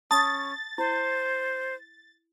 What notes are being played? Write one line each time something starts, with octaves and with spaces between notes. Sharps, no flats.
C#4 A5 D#6 A6
E4 C5